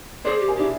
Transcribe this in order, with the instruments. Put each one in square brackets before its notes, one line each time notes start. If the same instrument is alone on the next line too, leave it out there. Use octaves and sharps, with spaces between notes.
[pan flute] G#4 [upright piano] C5 D5
[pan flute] G4
[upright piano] G#4 A#4
[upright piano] D4 E4 [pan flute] G4